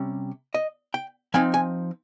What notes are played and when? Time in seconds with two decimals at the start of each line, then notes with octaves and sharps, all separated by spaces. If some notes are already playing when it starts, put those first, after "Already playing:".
Already playing: C3 G3 C#4
0.54 D#5
0.94 G5
1.34 F3 C4 D#4 G#5
1.54 G#5